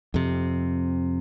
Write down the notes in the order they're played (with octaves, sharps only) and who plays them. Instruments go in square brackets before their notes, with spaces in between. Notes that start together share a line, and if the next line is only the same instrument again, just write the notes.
[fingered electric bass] F2 C3